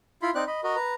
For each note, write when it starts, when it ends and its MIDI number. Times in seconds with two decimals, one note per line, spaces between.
0.22 0.31 64
0.22 0.31 65
0.22 0.31 83
0.22 0.31 84
0.35 0.44 60
0.35 0.44 63
0.35 0.44 74
0.35 0.44 90
0.47 0.61 75
0.47 0.61 83
0.64 0.75 66
0.64 0.75 70
0.64 0.75 75
0.76 0.94 71
0.76 0.94 82